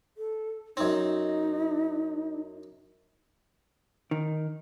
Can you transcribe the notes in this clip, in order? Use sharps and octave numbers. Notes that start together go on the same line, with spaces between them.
A4
F#2 C4 D#4
D#3